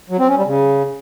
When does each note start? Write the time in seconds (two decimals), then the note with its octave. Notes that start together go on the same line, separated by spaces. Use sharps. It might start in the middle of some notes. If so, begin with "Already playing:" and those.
0.10 F#3
0.19 C4
0.28 C#4
0.37 G3
0.45 C#3